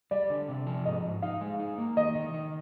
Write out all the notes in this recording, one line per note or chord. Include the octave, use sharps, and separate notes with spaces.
G3 D5
D3
C3
F3
G#2 D#5
G#2
D#4 F5
G#3
D#4
A#3
D#3 D#5
D#3
D#3